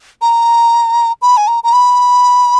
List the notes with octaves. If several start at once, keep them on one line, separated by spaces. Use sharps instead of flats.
A#5
B5
G#5
A#5
A#5
B5